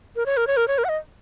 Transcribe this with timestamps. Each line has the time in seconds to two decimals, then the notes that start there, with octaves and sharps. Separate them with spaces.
0.16 A#4
0.26 C#5
0.37 A#4
0.47 C#5
0.57 A#4
0.68 C#5
0.78 A#4
0.84 F#5
0.89 D#5